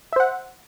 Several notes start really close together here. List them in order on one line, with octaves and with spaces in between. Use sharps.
E5 C5 F#5